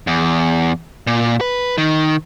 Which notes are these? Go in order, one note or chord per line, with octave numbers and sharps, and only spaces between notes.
E2
A#2
B4
D#3